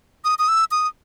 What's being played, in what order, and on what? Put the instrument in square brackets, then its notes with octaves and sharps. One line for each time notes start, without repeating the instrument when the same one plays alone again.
[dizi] D#6
D#6
E6
D#6